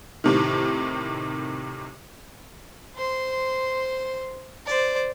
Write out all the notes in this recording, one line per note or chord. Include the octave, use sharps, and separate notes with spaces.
A2 C3 D#3
C5 C6
C5 D5